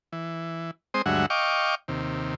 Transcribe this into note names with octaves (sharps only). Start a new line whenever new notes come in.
E3
G#3 C4 C5 D#6
D2 G2 F#3 G#3 E5 F#5
D#5 F5 G5 C#6 D6
D#2 C3